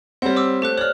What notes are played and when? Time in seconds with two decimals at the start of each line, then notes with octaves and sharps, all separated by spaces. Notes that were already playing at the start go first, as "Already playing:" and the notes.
0.22 G3 C4 C#5 F#5
0.36 C5 D6 E6
0.62 A3 G4 C5 F#6
0.78 C#5 D5 F6 F#6